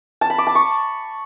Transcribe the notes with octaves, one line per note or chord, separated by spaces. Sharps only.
A5
B5
D6
A5
C#6